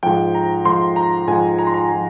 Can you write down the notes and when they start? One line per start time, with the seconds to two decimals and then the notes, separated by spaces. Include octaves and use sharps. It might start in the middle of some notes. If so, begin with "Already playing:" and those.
0.03 G#2 F3 G5
0.35 A#5
0.65 G#2 F3 C6
0.96 A#5
1.27 G#2 F3 G#5
1.59 A#5
1.67 C6
1.74 A#5
1.92 F3